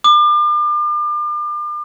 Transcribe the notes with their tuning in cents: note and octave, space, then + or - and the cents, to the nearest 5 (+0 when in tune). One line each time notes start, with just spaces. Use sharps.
D6 +40